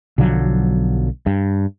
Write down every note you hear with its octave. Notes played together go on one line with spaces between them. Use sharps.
B1 D3 F3 F#3
G2